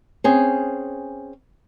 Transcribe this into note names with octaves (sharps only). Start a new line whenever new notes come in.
C4 C#4 G#4